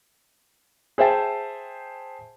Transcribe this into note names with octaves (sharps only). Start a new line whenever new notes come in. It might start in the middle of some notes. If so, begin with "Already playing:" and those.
G#4 C5 E5 G5 A5